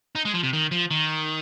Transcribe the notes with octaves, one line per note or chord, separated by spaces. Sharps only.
D#4
G#3
F3
C3
D#3
F3
D#3